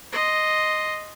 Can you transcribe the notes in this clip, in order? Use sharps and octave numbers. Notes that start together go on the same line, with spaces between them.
D#5 C6